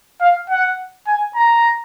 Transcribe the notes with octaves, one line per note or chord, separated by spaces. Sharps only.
F5
F#5
G#5
A#5